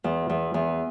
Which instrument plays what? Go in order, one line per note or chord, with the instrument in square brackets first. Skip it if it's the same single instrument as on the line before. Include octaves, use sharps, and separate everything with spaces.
[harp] E2
E2
E2